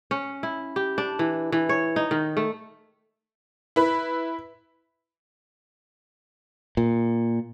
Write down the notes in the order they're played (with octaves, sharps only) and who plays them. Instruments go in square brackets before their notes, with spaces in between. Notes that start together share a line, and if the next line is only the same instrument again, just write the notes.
[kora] C#4
E4
G4
D4
E3
E3
C#5
D#4
D#3
A3
[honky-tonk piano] E4 B4
[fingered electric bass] A#2